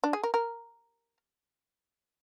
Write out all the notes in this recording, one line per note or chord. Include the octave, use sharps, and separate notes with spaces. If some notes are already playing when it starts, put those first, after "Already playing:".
D4
G#4
A#4
A#4